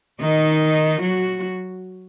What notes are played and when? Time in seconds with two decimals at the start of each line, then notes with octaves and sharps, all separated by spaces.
0.21 D#3 D#4
1.02 F#3 F#4